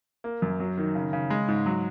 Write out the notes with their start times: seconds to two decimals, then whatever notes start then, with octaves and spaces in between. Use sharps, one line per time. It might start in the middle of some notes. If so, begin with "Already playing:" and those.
0.24 A#3
0.42 F#2
0.60 F#3
0.77 D#3
0.95 C#3
1.13 C#3
1.30 G#3
1.48 G#2
1.66 F#3